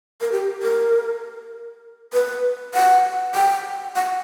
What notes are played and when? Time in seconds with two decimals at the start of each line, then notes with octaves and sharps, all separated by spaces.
0.21 A#4
0.32 G4
0.62 A#4
2.13 B4
2.74 F#5
3.35 G5
3.96 F#5